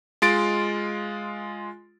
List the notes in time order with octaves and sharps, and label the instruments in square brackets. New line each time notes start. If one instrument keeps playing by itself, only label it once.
[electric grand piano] G#3 F4 C6 A6 D7